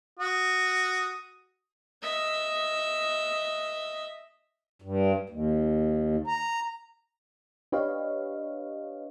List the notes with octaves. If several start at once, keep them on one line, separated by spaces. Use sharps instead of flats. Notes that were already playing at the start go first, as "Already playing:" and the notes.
F#4 D#6
D#5 E5
G2
D#2
A#5
D4 G4 B4 C#5 D#5 F5